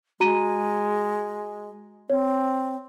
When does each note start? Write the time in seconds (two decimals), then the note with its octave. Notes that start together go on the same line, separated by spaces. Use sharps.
0.20 G#3 F#4 A#5 D#7
2.10 C4 C#5